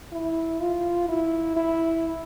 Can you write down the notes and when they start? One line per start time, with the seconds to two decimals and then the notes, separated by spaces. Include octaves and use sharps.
0.12 E4
0.61 F4
1.08 E4
1.56 E4